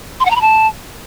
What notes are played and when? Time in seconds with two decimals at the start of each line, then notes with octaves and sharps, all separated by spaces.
0.20 C6
0.25 F#5
0.31 A#5
0.36 B5
0.41 A5